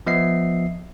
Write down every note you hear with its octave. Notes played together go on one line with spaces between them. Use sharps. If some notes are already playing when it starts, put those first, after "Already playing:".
F3 B3 D#5 E5 C7